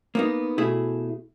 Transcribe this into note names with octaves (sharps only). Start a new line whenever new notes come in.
A#3 B3 D#4
B2 A3 E4 G#4